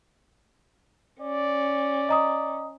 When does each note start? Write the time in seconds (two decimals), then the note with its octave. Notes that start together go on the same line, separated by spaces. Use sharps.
1.22 C#4 D5
2.09 D#5 A#5 D#6